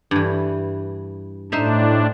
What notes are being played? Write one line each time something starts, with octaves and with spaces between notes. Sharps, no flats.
G2 E3
A2 D4 D#4 C5 E5